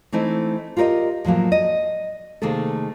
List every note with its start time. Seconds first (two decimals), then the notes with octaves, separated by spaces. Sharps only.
0.12 E3 A3 C4 D#4 E4
0.77 F4 G4 A#4 C#5 D#5
1.25 A2 F3 F#3 A#3
1.52 D#5
2.42 C3 D#3 A3 A#3 G#4 A4